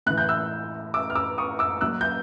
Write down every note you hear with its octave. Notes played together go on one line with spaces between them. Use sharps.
A2 E3 F#6
G6
E6 F#6
D6 E6
F6
D6 E6
C#6 D#6
D6 E6
A#2 F#3 E6 F#6
G6